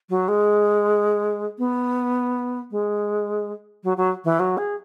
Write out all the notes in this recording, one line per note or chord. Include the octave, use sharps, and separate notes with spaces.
F#3
G#3
B3
G#3
F#3
F#3
E3
F#3
G#4